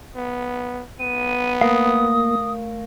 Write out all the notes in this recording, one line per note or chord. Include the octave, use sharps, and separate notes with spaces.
B3
B3 D#7
A3 A#3 A#4 F5 D#6